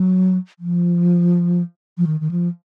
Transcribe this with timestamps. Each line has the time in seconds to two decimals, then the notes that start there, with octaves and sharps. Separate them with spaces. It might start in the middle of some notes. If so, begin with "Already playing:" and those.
Already playing: F#3
0.59 F3
1.98 F3
2.07 D#3
2.20 D#3
2.31 F3